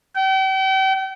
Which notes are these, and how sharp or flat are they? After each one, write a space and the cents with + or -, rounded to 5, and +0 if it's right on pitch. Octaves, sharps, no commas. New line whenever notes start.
G5 -40